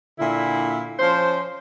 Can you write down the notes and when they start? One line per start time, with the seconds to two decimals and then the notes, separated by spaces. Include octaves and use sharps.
0.19 A#2 D3 E4
0.99 F3 C#4 C5